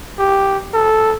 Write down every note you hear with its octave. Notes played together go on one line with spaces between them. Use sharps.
G4
A4